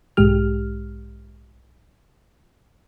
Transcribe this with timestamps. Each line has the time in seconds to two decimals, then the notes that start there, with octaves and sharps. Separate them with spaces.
0.17 B1 G#2 G#3 G4 F6